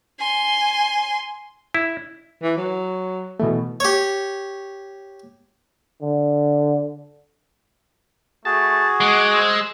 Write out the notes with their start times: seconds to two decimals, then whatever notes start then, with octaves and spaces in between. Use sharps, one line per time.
0.19 G#5 C6
1.74 E4
2.43 E3
2.57 F#3
3.39 B2 E3 A3
3.80 G4 C#5
6.02 D3
8.45 A3 F#4 G#4 A5
9.01 G#3 F#5 D6
9.34 C5 E6